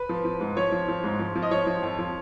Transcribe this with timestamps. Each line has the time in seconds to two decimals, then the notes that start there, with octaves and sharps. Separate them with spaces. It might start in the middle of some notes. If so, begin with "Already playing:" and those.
Already playing: B4
0.09 F3
0.25 F3
0.40 G#2
0.57 F3 C#5
0.72 F3
0.88 F3
1.04 G#2
1.19 F3
1.35 F3
1.43 D#5
1.51 F3 C#5
1.67 F3
1.83 F2
1.99 F3